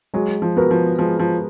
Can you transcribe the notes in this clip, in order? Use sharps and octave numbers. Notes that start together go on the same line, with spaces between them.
F#3 G#3
F3
B3 F#4 A#4
F3
F3 G#3
F3